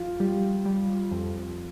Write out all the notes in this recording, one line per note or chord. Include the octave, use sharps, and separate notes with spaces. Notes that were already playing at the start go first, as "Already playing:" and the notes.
Already playing: F2 F4
G3
G3
F2